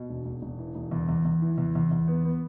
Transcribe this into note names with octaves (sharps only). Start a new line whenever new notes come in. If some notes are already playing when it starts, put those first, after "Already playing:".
Already playing: B2
E1
E1
E1
E3
E1
E2
E2
E2
E3
E2
E2
E2
B3
B3